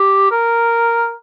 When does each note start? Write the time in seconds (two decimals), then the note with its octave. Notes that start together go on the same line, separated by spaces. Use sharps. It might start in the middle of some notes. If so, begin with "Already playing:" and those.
Already playing: G4
0.31 A#4